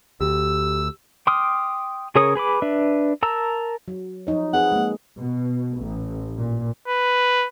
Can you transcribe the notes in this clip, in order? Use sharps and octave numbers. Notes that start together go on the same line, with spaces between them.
D2 G4 E6
G5 C6 D6 D#6 F6
C#3 G#4 A#4 C#5 D#6
G#4 B4 B5 D6
D4 B4 E5
A#4 A5 A#5 E6
F#3
F3 D#4 C#5
C4 G#4 B4 F#5
G#3 A#3
B2
A1
A#2
B4